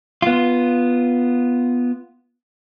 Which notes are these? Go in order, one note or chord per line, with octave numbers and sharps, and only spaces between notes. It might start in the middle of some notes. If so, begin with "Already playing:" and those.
B3 F4